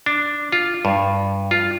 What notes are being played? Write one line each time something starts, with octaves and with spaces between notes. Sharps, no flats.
D4
F4
G2
F4